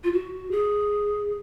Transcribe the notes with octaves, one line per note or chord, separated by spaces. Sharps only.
F4
F#4
G#4